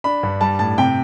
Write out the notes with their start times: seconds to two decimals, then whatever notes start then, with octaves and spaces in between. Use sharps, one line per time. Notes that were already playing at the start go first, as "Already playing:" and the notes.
0.04 D4 B5
0.23 G2
0.41 G3 A5
0.59 A2 A5
0.78 C3 G5